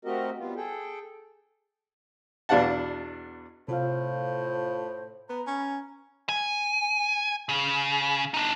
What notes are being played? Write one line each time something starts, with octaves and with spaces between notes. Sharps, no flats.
A3 C4 F#4 G4 A#4 D#5
G3 B3 F4
G#4 A4 G5
E2 B2 D4 F5 F#5 A5
A2 C3 F4 C5 F5
B3 A#5 B5
C#4
G#5
C#3
D4 D#4